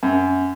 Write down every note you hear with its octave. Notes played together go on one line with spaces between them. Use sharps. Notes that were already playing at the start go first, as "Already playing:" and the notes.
F#2